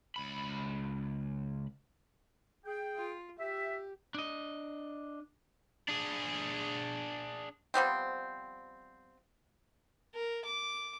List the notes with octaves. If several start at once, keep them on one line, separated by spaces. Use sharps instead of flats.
C#2 B5
G#4 G5
F4
G4 E5
D4 D#5
D4 G#4
F3 G3 B3 C4
A#4
D6